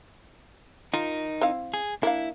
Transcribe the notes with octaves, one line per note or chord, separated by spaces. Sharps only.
D#4 F4 A#4
C4 E4 F5
G#4
A#3 D4 E4 F5